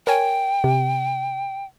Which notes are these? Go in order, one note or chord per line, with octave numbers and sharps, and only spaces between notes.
A#4 C#5 G5 G#5
C3